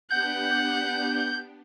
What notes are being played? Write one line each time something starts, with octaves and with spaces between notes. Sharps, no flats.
B3 D4 G4 F#5 G6